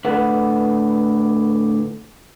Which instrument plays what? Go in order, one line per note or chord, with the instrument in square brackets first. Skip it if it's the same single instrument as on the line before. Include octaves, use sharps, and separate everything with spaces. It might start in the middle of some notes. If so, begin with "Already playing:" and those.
[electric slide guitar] A2 D3 B4 F#5